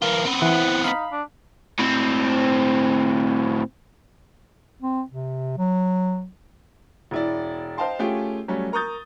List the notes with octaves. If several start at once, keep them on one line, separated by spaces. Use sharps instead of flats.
E3 F4 A#4
B3 C4
E3 F#5
D#4 F5 B5
D4
A2 C4
C4
C3
F#3
E1 E4 D5
C5 D#5 F5 G5 A5 C6
A3 C#4 F4 G4 G#4 G5
F#3 G3 A3 C#4
A#4 A#5 C#6 D#6 G6 A6